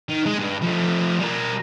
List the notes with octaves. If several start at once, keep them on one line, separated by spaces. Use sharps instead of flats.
D#3
G#3
G2
F3 A3
G3 A#4